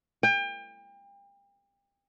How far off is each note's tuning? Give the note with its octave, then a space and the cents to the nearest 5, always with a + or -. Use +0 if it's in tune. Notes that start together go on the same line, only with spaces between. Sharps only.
G5 +35